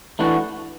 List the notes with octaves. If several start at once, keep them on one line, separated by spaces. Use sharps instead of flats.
E3 A3 D4 F#4